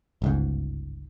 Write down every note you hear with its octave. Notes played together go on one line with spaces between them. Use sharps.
G1 C#2 G#2